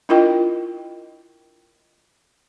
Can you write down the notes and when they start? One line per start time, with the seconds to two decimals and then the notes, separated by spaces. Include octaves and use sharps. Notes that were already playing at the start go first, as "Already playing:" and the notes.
0.09 D4 E4 F4 A#4 D#5 G5